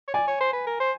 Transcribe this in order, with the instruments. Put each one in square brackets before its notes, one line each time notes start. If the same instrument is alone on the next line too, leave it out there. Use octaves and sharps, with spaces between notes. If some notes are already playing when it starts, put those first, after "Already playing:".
[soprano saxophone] C#5
[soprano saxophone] D5 [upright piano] G#5
[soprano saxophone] C#5
C5
B4
A#4
C5